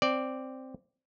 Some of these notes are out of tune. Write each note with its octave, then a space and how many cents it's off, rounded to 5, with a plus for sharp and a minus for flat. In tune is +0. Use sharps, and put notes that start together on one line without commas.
C4 +0 D5 +0